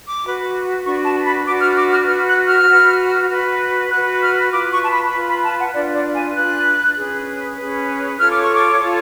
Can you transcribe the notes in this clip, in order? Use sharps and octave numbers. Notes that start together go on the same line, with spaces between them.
D6
F#4 B4
D4 F#4 B4 C#6
A5
B5
D4 F#4 B4 D6
F6
D6
F6
F#4 B4 F6
F#6
F6
F#4 B4
F#4 B4
F#4 B4 F#6
F6
F4 B4 D6
C#6
A5
B5
B5
F4 B4 A5
B5
A5
F#5
D4 F4 B4 D5
D5
G#5
D4 F4 B4 F#6
C#4 G#4 B4
C#4 G#4 B4
F4 A4 C#5 F6
D6
C#6
D6
F4 A4 C#5